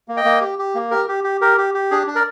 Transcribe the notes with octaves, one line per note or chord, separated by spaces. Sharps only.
A#3
D#5 G5
A#3
G4
G4
A#3
G4 A#4
G4
G4
G4 A#4
G4
G4
D4 G#4
D4
A#4 D5